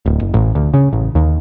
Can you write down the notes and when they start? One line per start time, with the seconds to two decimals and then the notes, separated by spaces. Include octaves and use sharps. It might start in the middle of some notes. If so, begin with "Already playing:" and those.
0.06 D1
0.21 F#1
0.34 A1
0.55 D2
0.74 C#3
0.93 A1
1.15 D#2